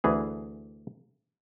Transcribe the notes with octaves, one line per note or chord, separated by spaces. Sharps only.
D2 E3 G#4